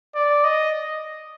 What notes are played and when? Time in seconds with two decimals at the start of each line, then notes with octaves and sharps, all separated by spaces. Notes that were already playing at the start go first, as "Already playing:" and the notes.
0.15 D5
0.44 D#5